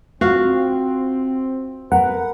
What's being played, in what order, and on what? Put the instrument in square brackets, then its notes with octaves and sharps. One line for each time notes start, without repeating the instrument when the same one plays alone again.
[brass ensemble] C4 [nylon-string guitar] F4 [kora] F#4 F5
[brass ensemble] B3 B4 [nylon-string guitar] A#4 [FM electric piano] F#5